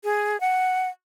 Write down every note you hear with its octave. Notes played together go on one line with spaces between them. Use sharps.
G#4
F#5